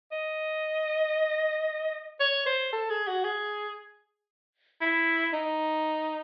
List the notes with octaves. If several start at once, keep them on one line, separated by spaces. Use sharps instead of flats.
D#5
C#5
C5
A4
G#4
F#4
G#4
E4
D#4